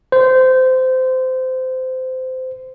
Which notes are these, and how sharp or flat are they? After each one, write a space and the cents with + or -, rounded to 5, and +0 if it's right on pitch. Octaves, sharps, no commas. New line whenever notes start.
C5 -20